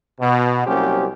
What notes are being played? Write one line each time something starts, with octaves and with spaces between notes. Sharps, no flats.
B2
C2 F#3 A#3 C#4 G4 C5